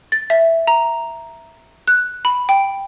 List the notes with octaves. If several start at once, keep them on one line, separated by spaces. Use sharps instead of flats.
A6
E5
A#5
F#6
B5
G5